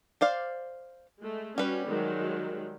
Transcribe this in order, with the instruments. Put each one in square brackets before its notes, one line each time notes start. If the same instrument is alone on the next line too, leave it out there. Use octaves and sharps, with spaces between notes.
[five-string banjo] C5 D5 F5
[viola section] G#3 A3
[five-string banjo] G3 B4 [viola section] C#4 F#4
[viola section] D#3 F#3 G#3